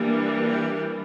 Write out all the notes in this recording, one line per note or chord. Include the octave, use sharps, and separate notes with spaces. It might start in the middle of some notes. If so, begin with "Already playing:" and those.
Already playing: E3 G3 A#3 D4
G4